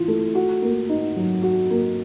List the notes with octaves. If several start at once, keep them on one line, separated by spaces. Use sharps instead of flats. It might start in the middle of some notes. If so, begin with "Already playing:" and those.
Already playing: E3 F4
A3
F#4
A#3
D#4
F#3
F#4
A#3